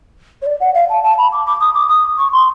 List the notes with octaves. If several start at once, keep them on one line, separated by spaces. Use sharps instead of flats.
C#5
D5
F#5
F5
A5
A5
B5
D6
D6
D#6
D6
D#6
C#6
C6